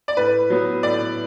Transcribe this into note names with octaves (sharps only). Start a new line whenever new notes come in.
D5
A2 B4
F#3 B3
A2 D5